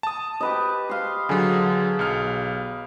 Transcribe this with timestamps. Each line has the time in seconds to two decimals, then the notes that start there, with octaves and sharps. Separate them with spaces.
0.03 A5 D#6
0.40 G4 B4 D#5
0.89 F5 C6
1.29 D3 F#3 G#4
1.99 B1 F6